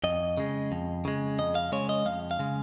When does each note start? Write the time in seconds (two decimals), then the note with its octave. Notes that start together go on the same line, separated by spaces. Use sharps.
0.04 F2 D#5
0.37 C#3 G#3
0.72 F2
1.05 C#3 G#3
1.38 F2 D#5
1.55 F5
1.72 C#3 G#3 C#5
1.89 D#5
2.05 F2 F5
2.31 F5
2.39 C#3 G#3